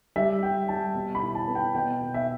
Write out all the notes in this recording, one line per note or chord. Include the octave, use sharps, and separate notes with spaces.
G3 E5
G3 G5
G3 A5
B2
B5
E4
A5
B3
G5
B2 G5
B2
E5